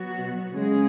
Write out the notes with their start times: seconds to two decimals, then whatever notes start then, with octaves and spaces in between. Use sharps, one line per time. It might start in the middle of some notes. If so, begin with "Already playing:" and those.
Already playing: F#3 B3 F#4
0.18 B2
0.52 C#3 G#3 C#4 G#4